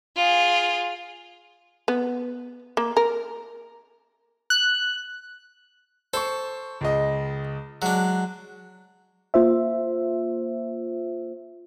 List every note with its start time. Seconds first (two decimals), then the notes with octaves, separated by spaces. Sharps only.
0.16 F4 G#4
1.88 B3
2.77 A#3
2.97 A#4
4.50 F#6
6.14 A4 C5 C#6
6.81 C#2 G#3 D#5
7.82 F#3 G#3 D4
9.34 A#3 F4 C5 E5